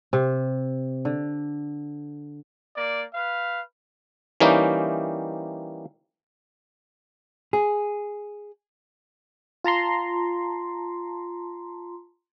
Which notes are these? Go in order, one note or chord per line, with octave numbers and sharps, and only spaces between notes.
C3
D3
A#3 D5
B4 F5
E3 G3 A#3 C#4 D#4 G4
G#4
F4 A5 A#5 C6